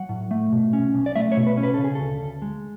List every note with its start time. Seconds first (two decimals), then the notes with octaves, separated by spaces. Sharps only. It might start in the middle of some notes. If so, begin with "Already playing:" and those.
Already playing: F#3 F#5
0.09 A2
0.31 A3
0.52 B2
0.73 C#4
0.94 B1
1.06 D5
1.16 A3 E5
1.32 C#5
1.37 B2
1.47 B4
1.57 C#4
1.63 B4
1.74 C#3 A4
1.84 G#4
1.95 D2 A4
2.21 D2
2.42 G#3